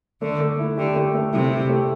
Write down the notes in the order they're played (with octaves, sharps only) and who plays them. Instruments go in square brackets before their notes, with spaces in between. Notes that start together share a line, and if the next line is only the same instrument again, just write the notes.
[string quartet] D3 [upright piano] A3
[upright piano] A3
E4
[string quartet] D3 [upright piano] G4
[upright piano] A3
A3
[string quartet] C3 [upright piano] E4
[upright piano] G4
A3